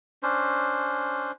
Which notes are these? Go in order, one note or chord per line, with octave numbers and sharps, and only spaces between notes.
C#4 D4 C5